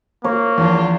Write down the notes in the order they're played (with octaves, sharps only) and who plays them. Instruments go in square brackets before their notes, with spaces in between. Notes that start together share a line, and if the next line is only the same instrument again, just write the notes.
[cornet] A#3 [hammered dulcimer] C#5
[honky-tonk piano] E2 [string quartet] F3 D4 F4